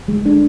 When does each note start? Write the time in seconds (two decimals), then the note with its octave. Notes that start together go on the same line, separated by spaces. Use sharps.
0.08 G#3
0.26 D4